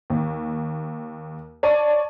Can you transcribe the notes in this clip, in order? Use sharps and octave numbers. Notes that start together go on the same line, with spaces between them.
D#2
C#5 D5 A5 D#7